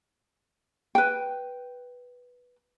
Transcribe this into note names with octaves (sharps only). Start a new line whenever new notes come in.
B4 G5